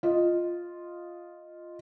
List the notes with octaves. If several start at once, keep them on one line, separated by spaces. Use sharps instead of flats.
F4 D#5